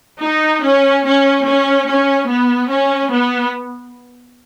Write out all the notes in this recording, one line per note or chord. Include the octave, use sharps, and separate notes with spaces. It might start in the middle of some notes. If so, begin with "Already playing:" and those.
D#4
C#4
C#4
C#4
C#4
B3
C#4
B3